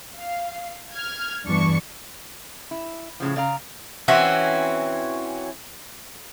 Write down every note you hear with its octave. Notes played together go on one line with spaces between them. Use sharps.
F5
F6 G#6
E2 G2 E3 D4 C#6 C#7
E4
A2 C#3 F3
C#3 D5 F5 A#5
E3 C4 C#4 F#4